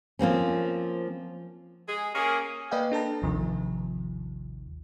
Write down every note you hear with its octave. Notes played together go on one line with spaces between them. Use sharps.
F3 A#3 C4 C#4
G#3 G#4
A#3 C#4 G#4
A#3 B4 D5 D#5 F5 G5
D4 A4 A5 A#5
A1 D#2 C3 D#3 F3